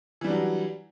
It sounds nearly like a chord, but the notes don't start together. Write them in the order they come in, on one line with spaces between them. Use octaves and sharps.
E3 G3 D4 F#3